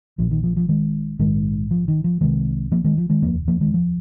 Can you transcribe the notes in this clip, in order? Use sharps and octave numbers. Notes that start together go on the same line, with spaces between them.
A#1 A#2 F3
D#3
F3
F3
D#3 G#3
A#1 G#2 D#3 G#3
F3
D#3
F3
C2 C3 D#3 G#3
F3 A#3
D#3 G#3
F3
D#3 G#3
F1 D#2 F3 A#3
F3 A#3
D#3 G#3
F3